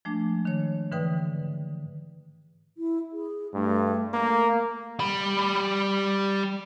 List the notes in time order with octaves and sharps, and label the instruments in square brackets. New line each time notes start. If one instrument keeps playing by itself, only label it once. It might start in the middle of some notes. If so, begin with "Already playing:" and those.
[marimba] F3 G#3 A3 D4
D#3 C#5
G#2 D3 E3 B4 G5 D#6
[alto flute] E4
G#4
[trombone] G2 [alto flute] A3
[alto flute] A3 [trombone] A#3
[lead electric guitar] G3 B5